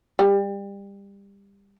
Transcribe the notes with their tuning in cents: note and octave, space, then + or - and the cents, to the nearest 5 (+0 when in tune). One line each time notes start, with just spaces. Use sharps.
G3 +25